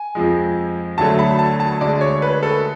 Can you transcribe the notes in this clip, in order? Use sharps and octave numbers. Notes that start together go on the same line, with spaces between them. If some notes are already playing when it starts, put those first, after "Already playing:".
Already playing: G#5
F2 F3 G#3
D2 D3 F#3 A3 A5
B5
A5
A5
D2 D3 G#3 D5
C#5
B4
A4